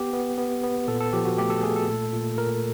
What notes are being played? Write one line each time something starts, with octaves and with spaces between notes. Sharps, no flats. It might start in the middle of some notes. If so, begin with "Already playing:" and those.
Already playing: B3 G4
B3
B3
B3
A#2 A4
A4
F3 G4
F#4
A3 G4
A4
A3 G#4
A4
A#2
A#2
A#2 A#4